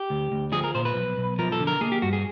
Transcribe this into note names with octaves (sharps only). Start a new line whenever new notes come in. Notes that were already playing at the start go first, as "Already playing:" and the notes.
Already playing: G4
D2
D2
F3 G#4
A#4
A#2 C5
B4
B1
B1
F3 A#4
A4
D3
A#4
A#3 G#4
G4
G2 F#4
G#4